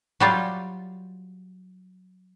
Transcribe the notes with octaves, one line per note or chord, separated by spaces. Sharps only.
F#3 G3 F4